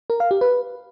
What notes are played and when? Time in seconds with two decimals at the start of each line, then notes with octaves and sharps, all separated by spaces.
0.10 A#4
0.20 F5
0.31 G4
0.41 B4